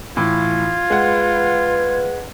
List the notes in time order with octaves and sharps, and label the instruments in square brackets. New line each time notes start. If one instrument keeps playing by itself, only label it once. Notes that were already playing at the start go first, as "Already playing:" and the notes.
[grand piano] A2 E3 [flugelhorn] F4 [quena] G#6
[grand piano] G#3 F#5 [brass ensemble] B4